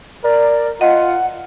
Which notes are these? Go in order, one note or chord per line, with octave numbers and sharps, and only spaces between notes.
A#4 D5
F4 D#5 F#5